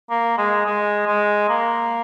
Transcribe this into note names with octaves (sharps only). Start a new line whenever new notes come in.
A#3
G#3
G#3
G#3
A#3